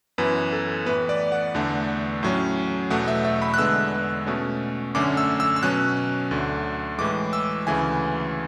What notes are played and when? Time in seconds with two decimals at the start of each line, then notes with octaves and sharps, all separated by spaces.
0.18 F#2 E3 B3 B4
0.52 A4
0.86 A2 E3 B3 B4
1.09 D5
1.32 F#5
1.54 E2 D3 A3
2.23 A2 F#3 C#4
2.90 E2 B2 A3 F#5
3.08 E5
3.25 E5
3.42 B5
3.54 F#6
3.58 E2 D3 G#3 B3 E6
4.26 B2 A3 C#4
4.95 F#2 D3 A3 C#4 D6
5.17 E6
5.40 E6
5.56 E6
5.63 B2 F#3 C#4 F#6
6.31 D2 D3 A3
6.98 A2 E3 G#3 D6
7.33 E6
7.67 D2 C#3 E3 A3 G#5